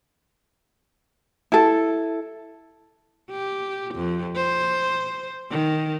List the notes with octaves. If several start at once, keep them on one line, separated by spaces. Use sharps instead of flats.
E4 A4
G4
F2
C5
D#3